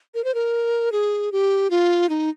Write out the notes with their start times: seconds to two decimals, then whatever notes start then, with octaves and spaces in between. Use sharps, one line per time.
0.14 A#4
0.24 C5
0.34 A#4
0.92 G#4
1.32 G4
1.70 F4
2.09 D#4